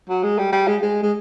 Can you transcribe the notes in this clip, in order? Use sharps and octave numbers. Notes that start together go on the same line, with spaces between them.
F#3
G#3
G3
G3
G#3
G#3
G#3